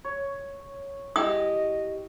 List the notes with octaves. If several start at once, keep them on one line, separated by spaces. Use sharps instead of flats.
C#5
E4 G4 G#4 D#5 D#6